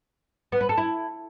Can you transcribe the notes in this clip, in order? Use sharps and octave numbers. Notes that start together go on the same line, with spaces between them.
B3
B4
A4
E4